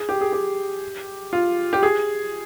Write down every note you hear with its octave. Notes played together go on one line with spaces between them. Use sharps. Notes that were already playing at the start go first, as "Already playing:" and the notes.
Already playing: G#4
G4
G#4
G4
F4
G4
G#4